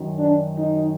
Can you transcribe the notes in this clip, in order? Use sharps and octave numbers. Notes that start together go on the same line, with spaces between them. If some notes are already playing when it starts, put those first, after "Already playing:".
Already playing: F#2 D#3
D4
D#4